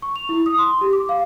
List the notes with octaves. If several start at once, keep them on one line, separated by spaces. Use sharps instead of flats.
C#6
F7
E4
D#6
C6
G4
D6
F5